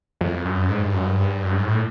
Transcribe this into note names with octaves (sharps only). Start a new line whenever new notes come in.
F2
F#2
G#2
G2
F#2
G2
F#2
G2
G#2
A2